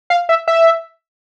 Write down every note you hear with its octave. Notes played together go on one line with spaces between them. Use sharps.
F5
E5
E5